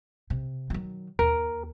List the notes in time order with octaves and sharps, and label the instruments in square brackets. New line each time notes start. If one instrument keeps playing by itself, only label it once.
[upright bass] C3
D#3 F#3
[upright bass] D#2 [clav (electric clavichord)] A#4